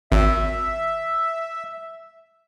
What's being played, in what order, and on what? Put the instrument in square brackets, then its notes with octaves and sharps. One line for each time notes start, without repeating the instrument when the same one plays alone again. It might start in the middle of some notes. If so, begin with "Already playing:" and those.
[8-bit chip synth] G#1 [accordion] E5